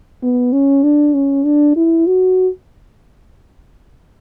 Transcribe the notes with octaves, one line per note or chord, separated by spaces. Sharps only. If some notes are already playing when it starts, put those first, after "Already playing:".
B3
C#4
D4
C#4
D4
E4
F#4